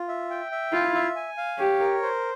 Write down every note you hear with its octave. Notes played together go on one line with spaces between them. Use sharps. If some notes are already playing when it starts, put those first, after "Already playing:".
Already playing: F4
E5
G5
E5
E4 F4
E5
G#5
F5
G4 C#5
A#4
C5